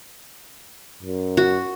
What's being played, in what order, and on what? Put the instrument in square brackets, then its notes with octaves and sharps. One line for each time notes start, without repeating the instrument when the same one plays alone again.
[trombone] F#2
[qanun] F#4